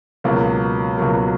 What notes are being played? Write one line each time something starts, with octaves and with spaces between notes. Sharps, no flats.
C#2 B2 F#3 A#3
C#2 B2 F#3 A#3